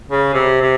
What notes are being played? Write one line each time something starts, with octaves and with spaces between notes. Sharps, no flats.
C#3
C3
C3